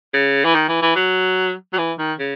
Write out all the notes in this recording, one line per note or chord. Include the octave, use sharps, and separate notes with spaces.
C#3
E3
D#3
E3
E3
F#3
F#3
E3
D#3
C#3